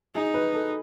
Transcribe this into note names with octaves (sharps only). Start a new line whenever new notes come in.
D#4 G#4
B4
A4